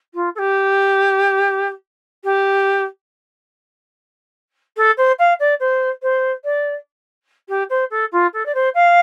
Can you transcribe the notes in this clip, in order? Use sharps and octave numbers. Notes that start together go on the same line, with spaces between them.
F4
A4
G4
G4
A4
C5
F5
D5
C5
C5
D5
G4
C5
A4
F4
A4
D5
C5
F5